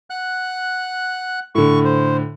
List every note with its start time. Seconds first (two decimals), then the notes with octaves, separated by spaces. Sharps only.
0.10 F#5 F#6
1.55 A2 D3 C#6
1.85 C5